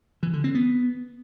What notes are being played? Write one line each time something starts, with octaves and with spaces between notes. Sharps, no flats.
E3
D3
C4
B3